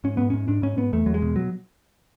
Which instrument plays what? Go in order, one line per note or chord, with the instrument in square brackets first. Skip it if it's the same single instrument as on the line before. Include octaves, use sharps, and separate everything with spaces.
[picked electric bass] G#2 C#4
G#2 B3
G#2 C#4
G#2 D4
G#2 C#4
G#2 B3
E2 A3
E2 F#3
G#3
B2
F#3